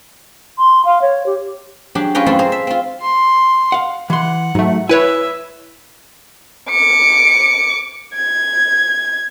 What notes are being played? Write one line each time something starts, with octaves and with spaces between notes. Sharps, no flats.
C6
F5
C#5
G4
F#3 D4 G4 G#4
C#4 F4 G#4 B4 G5 A#5
F#2 A3 C4 E4 F4 A4
G#4 C5 A#5
E5
C4 F4
C6
F5 F#5
E3 F#5 C6
G#2 F#3 A3
E4 B4 C#5 E5 G#5
D6 C#7
G#6